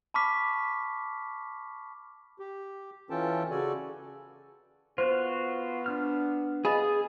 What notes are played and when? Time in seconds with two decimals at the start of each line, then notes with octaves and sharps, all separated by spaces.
0.14 A5 B5 C#6 D6 F6 B6
2.39 G4
3.10 E3 C#4 F4 A4 G5 A5
3.50 C#3 F#4 A4 D5 G#5
4.98 B3 F4 F#4 C5
5.86 D4 F6
6.65 G#4 D#5 F5 B5